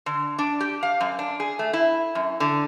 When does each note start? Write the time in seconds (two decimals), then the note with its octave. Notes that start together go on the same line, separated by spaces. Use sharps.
0.06 D3
0.38 D4
0.60 G4
0.83 F5
1.00 F#2
1.19 D4
1.40 G#4
1.59 A3
1.73 E4
2.15 F#2
2.40 D3